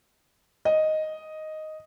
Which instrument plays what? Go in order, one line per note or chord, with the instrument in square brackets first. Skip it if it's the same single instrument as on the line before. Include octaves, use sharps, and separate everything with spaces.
[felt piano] D#5